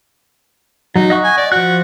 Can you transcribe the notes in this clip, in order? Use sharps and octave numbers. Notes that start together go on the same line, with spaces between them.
F#3 D#4
D#5 F#5 C#6
G#5
D5
F3 F#4 F#6